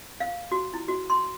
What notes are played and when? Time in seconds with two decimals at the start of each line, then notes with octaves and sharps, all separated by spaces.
0.20 F5
0.51 F#4
0.74 E4
0.88 F#4
1.10 C6